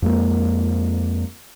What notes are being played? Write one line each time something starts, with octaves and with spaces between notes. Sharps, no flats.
F2 G#3 A#3